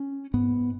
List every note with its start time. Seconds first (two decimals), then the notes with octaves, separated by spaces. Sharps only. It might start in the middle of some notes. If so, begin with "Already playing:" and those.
Already playing: C#4
0.34 G#2 B3